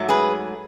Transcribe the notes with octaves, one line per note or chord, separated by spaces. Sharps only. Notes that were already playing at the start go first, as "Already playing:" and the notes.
Already playing: G#2 F#3 A3
G#4 B4